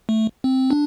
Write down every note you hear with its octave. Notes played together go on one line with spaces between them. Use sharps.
A3
C4
D4